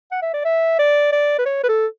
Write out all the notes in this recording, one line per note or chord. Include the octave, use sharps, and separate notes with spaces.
F#5
E5
D5
E5
D5
D5
B4
C#5
B4
A4